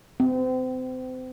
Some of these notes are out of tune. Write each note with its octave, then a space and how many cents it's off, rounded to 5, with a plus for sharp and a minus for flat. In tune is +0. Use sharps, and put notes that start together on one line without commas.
C4 -35